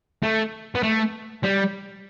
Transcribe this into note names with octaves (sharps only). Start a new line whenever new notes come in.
A3
B3
A3
G3